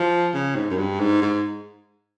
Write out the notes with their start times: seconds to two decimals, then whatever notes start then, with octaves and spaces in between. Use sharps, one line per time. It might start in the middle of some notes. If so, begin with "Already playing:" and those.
Already playing: F3
0.34 C#3
0.55 G#2
0.70 F#2
0.78 G2
0.99 G#2
1.22 G#2